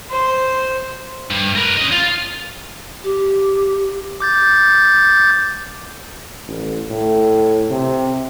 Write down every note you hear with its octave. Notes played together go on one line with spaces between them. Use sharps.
C5
G2
A#4 B4
C#4 D#5
F4
G4
D6 G6 A6
A1
A2
C3